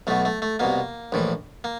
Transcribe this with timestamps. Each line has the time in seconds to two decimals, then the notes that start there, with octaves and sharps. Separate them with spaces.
0.07 B1 B2 A3
0.25 A3
0.42 A3
0.59 C2 B2 A#3
1.12 A#1 A2 E3
1.64 A#3